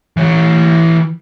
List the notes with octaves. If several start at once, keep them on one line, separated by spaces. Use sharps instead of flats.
E3 C#5